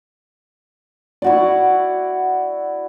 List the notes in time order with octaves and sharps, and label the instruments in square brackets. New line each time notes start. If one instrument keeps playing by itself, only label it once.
[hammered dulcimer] E4 F#4 D5